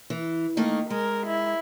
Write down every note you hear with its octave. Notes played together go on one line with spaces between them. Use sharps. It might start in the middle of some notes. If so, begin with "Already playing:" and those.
E3
D#3 A3 A#3 D#4
G#3 A#4
E4